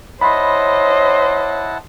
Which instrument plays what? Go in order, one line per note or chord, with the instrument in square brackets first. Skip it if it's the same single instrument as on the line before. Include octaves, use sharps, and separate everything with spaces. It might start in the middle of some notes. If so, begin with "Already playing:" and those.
[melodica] E4 F#5 A5 [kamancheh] C5 D#5 [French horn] C#5 [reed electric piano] B5 C6